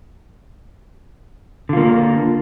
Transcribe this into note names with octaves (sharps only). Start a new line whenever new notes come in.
D3 A#3 F4